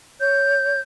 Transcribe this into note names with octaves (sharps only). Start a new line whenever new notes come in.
C#5 G6